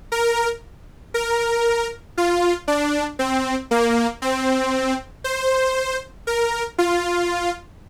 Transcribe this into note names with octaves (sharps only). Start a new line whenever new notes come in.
A#4
A#4
F4
D4
C4
A#3
C4
C5
A#4
F4